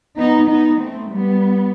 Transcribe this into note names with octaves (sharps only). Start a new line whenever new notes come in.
B3 D#4
B3 D#4
A3 C4
G3 B3